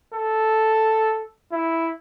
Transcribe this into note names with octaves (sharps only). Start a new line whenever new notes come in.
A4
E4